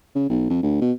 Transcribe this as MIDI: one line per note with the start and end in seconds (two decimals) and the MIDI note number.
0.15 0.26 49
0.30 0.45 35
0.50 0.62 41
0.63 0.80 38
0.82 0.92 47